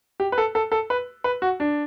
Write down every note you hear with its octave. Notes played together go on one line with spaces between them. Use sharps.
G4
B4
A4
A4
A4
B4
B4
F#4
D4